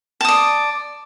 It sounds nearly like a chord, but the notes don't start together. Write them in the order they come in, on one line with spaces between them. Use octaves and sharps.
A5 D#6 D5